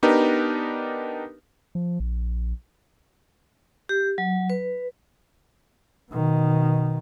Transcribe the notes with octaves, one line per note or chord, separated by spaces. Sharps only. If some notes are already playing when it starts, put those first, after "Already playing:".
B3 D4 D#4 G4 A#4 B4
F3
A#1
G4
F#3
B4
B2 D#3